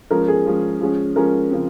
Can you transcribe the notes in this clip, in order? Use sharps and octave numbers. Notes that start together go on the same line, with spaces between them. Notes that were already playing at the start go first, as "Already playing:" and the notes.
F3 G#3 C#4 A#4
G#4
F3 G#3 C#4
F3 G#3 C#4
F3 G#3 C#4 A#4
C#3 F3 C4